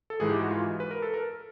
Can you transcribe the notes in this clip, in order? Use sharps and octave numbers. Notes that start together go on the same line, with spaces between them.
A4
G#2 E3 G#3 G#4
G4
F#4
F4
B4
A#4
A4
A#4